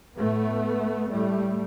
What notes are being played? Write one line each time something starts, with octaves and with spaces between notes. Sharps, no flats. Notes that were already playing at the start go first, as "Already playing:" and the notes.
A2 A3 B3
A2 G3 A3